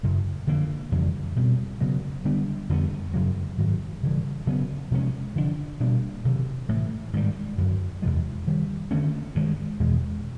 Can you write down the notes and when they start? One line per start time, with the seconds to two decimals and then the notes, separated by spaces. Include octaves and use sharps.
0.03 F#2 C#3 F#3
0.47 D3 F3 A#3
0.92 F2 C#3 E3 G3
1.36 B2 G3 C4
1.81 C#3 F#3 B3
2.25 D3 G3 B3 D4
2.69 F2 D3 G3 B3
3.14 F#2 C#3 F#3
3.58 G#2 D#3 F#3
4.03 C#3 E3 G3
4.47 C#3 F#3 B3
4.91 C3 F3 G#3 C#4
5.36 D3 F3 A#3 D4
5.80 B2 G3 A#3 D4
6.25 C3 D#3 F#3
6.69 A2 E3 A3
7.13 G#2 D#3 G3
7.58 F#2 D3 F#3
8.02 E2 C3 F3 G#3
8.46 G2 D#3 G3
8.91 D3 F#3 A3 C#4
9.35 G2 D#3 G#3
9.80 E2 B2 G#3